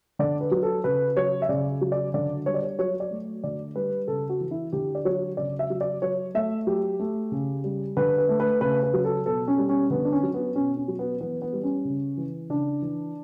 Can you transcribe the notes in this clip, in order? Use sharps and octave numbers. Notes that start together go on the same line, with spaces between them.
D3 D5
B4
F#3
A4
C#3 B4
F#3 C#5
E5
C#3 D5
F#3
D5
D3 D5
G3 C#5
D5
C#5
F#3 C#5
D5
A3
D3 D5
G3 B4
C#3 A4
F#4
E3
E4
D3 G4
D5
F#3 C#5
C#3 D5
E5
F#3
D5
F#3 C#5
A3 E5
F#3 G4
A3
C#3
G3
D3 B4
B4
A3
B4
C#3 B4
B4
F#3
A4
B2 A4
C#4
G3
C#4
D3 B3
D4
C#4
F#3
B3
B2 C#4
C#4
F#3
B3
E3 B3
B3
G3
C#4
C#3
E3
C#3 D4
E3